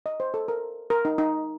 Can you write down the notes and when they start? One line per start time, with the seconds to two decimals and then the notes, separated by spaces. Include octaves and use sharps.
0.06 D#5
0.20 C5
0.34 A4
0.48 A#4
0.90 A#4
1.05 D#4
1.18 D#4